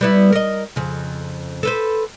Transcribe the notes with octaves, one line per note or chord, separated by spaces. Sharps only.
G3 B3 E4
A#4 D#5
F2 C#3
A4 B4 C5